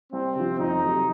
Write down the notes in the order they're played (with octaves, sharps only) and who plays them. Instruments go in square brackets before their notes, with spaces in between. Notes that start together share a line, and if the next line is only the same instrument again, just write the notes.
[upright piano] C2 [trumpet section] C4
[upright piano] C3 F3
[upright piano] F2 [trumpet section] D#4
[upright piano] C3 F#3